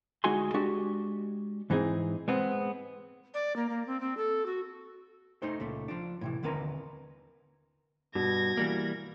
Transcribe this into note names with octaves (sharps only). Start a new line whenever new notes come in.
D2 G#3 D#4 F#4 G#5 C6
G#3 D4 F#4 G4
G#2 E3 C4 D#4 G#4
G#3 B3 C4
D5
A#3
A#3
C4
C4
A4
F#4
A3 D#4 C5
C#2 A#2 A3
F3 D4
A2 C3 E3
D#2 D3 C4 A#4 B4 A#5
G2 B2 G#6 A#6
E3 G3 A#3